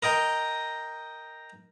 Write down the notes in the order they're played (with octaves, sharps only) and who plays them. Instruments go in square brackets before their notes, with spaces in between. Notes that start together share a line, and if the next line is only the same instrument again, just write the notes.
[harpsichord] A#4 D#5 G5 A#5